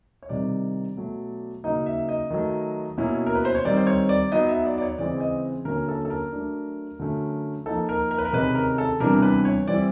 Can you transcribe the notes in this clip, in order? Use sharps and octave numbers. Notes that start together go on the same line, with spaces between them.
C#5
C3 D#3 G3 D5
B2 F#3 A3
C#3 F#3 A#3 D#4 D#5
E5
D#5
D#3 F#3 A3
B2 F#3 A#3 C#4 E4
A#4
B4
C5
C#5
D#3 G3 C4 D5
C5
C#5
D5
F#3 B3 D#4 D#5
E5
D5
D5
C#5
C#3 E3 G#3 C4 D5
D#5
D3 F#3 A#3 C#4 A#4
A4
A4
A#4
F#3 A3 D4
D3 F#3 A3 C#4
F3 A#3 D#4 A4
A#4
A#4
B4
A#4
C3 D#3 G#3 C#4 B4
A#4
A4
C3 E3 G3 B3 D4 A#4
B4
C#5
E3 G3 C4 E4 D5